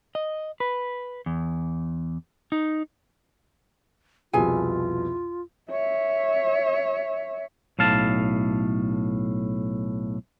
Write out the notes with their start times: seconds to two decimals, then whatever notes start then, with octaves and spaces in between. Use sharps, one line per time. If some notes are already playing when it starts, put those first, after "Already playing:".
0.15 D#5
0.60 B4
1.26 E2
2.52 D#4
4.33 C2 F2 B2 E4 F4 G#4 G#5
5.71 C#5 E5
7.79 B1 A2 F5 A5